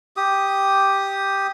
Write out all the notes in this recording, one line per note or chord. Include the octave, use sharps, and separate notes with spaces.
G4 D#6